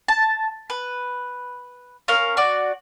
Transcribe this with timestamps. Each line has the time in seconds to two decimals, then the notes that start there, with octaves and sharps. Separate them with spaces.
0.08 A5
0.70 B4
2.08 C#4 A#4 F5
2.37 F#4 D5